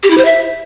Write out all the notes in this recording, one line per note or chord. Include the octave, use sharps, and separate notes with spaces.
G4
E4
C5
E5